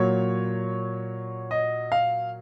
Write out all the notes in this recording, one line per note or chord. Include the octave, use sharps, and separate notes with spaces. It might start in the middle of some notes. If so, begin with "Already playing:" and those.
Already playing: A#2 F#3 C#5
D#5
F5